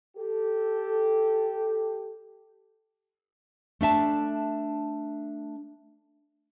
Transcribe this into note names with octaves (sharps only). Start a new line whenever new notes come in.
G4 A4
A3 D4 E5 A5